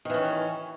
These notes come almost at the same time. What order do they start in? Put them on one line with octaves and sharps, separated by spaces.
D#3 E3 C#4